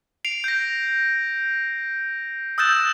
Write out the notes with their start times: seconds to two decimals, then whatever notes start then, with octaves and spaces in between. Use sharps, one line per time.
0.25 C7 D7 F7
0.44 G6 A#6
2.58 D#6 E6 F#6 G6 A6 E7